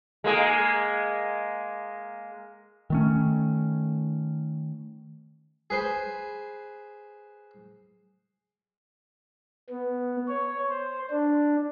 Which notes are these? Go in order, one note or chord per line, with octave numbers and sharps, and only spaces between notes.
G#3 A#3 G#4
D#3 A3 C#4
G#4 B4 C5
B3
C#5
C5
D4